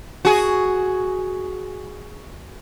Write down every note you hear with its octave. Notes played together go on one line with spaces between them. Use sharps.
F#4 G#4